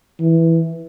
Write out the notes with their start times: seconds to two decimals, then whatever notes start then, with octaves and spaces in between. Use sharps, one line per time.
0.20 E3